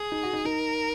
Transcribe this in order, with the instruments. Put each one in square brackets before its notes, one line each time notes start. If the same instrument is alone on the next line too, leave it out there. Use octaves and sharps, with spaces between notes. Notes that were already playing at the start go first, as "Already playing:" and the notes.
Already playing: [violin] G#4
[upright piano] D#4
F#4
D#4
[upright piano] D#4 [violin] A#4